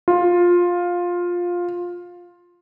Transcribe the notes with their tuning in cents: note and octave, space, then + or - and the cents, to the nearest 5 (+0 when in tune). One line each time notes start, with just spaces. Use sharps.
F4 +10